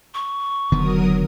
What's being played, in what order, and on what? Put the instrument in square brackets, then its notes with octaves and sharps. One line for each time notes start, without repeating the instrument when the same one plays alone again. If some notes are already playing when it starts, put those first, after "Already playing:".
[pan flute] C#6
[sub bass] F1 [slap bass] D3 D#3 B3 [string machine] F#3 A#4 D#6